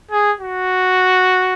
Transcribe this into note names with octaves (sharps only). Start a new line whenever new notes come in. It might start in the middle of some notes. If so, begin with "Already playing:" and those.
G#4
F#4